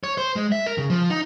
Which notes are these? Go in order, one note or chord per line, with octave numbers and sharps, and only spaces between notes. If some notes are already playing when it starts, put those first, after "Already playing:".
C#5
C5
G#3
E5
A#4
C#3
F3
D#4